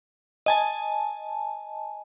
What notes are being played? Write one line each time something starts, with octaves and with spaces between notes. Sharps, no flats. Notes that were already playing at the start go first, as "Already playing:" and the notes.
D#5 G#5 A5